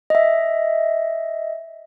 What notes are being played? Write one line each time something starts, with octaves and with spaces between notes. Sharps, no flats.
D#5 E5